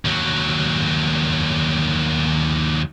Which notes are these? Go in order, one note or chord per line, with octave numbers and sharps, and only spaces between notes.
D#2 F#3